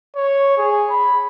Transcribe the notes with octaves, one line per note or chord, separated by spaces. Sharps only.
C#5
G#4
B5